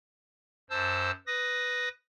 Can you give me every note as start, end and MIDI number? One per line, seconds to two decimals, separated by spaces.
0.70 1.11 42
0.70 1.11 72
0.70 1.11 81
0.70 1.11 88
1.27 1.89 71
1.27 1.89 87
1.27 1.89 94